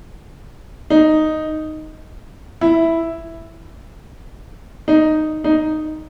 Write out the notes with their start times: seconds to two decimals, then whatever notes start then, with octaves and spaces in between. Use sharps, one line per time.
0.90 D#4
2.61 E4
4.88 D#4
5.44 D#4